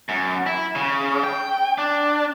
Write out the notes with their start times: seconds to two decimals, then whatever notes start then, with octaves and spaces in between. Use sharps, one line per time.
0.09 F#2
0.47 E4
0.75 C#3
1.24 G5
1.78 D4